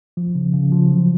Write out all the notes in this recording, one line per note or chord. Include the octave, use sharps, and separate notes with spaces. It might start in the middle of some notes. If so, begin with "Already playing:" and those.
F3
C#3
C#3
F3
F#3